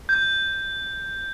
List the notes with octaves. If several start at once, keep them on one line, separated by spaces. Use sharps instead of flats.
G6